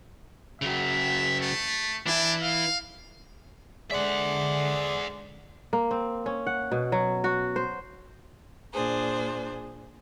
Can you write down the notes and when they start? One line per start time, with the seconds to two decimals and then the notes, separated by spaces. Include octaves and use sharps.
0.62 C#3 F#3 E5
1.41 A3
2.07 E3 D4 E4
2.43 F5
3.91 D3 G#3 G#4 C5 D5 E5 F#5
5.73 A#3
5.91 C4
6.26 C#4
6.47 F#5
6.72 B2
6.92 F#3
7.24 F#4
7.56 C5
8.72 A#2 D4 G#4 C5